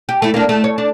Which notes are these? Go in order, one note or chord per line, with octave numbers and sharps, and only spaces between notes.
G4
A3 E4
A#3 D4
A3
C#5
D4